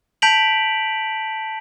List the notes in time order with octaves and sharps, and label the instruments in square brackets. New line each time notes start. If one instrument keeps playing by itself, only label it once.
[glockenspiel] A5 G6 B6 D7 F7 F#7